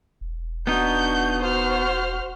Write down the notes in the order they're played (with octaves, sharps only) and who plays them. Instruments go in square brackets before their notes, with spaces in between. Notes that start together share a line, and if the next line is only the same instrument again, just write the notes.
[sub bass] E1
[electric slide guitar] B3 D#4 [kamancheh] D4 F#4 [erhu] G6
[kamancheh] F#4 F6 [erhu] C5